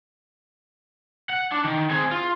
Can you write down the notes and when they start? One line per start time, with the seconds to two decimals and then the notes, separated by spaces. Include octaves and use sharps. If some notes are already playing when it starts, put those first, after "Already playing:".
1.30 F#5
1.52 D4
1.65 D#3
1.91 C4 G#4
2.11 F4